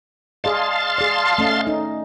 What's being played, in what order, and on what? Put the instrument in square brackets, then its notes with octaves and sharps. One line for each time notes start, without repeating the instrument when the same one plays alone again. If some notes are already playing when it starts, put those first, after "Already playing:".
[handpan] G#4 D5 D#5 [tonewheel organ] F5 A5 C6
[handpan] G#4 D5
A3 C#4 D#5
D#4